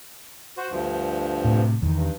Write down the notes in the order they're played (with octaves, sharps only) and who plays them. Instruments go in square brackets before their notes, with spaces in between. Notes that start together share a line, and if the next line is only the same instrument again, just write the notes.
[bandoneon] F#4 C5
D2 G2 F3
[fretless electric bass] A2 C3
E2 D#3
[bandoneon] G2